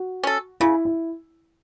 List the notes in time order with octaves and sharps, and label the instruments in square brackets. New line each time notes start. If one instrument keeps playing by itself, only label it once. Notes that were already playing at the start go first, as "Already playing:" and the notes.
Already playing: [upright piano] F#4
[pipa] C#4 A4
[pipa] C#3 [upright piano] E4
[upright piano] E4